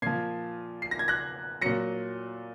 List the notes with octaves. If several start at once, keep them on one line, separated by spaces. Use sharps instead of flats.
A#2 F3 G#6 C7
C7
A#6
G#6
F#6 A#6
A#2 F#3 A#6 C#7